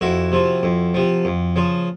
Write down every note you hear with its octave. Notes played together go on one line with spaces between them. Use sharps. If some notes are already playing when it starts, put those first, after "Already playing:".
F2 E4 F#4
C3 F3
F2
C3 F3
F2
C#3 F3